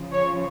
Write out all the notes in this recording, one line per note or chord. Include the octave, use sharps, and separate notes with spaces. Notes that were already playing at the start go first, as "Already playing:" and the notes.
Already playing: C#3 F3
C#5